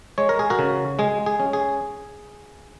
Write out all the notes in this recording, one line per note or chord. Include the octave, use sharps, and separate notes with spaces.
G#3 C#5
A#4
G#4
F#4 A#4
C#3
G#3 G#4
G#4
C#4
G#4